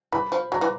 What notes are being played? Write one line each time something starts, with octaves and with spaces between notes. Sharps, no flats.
E3 B5
F3
F#3 A#5
E3